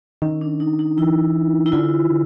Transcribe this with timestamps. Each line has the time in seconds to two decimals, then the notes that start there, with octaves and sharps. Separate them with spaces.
0.22 D#3 C#4
0.41 D4
0.60 D#4
0.79 D#4
0.98 E3 E4
1.66 E4
1.72 D3 F4
2.04 D#3
2.10 D3